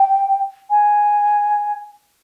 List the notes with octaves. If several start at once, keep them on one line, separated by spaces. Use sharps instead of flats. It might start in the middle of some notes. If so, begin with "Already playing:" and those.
Already playing: G5
G#5